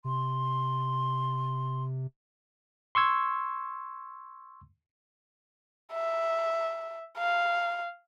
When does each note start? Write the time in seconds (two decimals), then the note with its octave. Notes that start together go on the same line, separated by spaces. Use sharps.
0.04 C3 C6
2.95 C6 C#6 E6 G#6
5.93 E5
7.18 F5